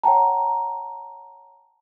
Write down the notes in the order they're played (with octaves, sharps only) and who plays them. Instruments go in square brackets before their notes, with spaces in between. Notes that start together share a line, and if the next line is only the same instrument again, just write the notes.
[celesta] C#5 F#5 G5 A5 A#5